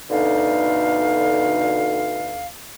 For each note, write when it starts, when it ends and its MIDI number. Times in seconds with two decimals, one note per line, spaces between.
0.10 2.46 38
0.10 2.46 47
0.10 2.46 50
0.10 2.46 63
0.10 2.46 77